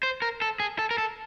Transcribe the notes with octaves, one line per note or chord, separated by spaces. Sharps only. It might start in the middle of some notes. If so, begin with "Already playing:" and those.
C5
A#4
A4
G#4
A4
A#4
A4